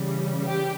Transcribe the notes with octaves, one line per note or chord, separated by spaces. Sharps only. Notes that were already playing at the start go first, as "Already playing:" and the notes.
Already playing: C#3 E3 G3
G4